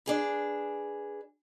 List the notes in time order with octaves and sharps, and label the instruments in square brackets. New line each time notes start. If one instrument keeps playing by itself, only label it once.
[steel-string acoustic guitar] D4 G#4 B4